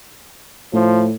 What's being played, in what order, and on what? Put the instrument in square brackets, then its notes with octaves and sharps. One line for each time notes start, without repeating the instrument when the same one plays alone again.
[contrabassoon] A2 [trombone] F3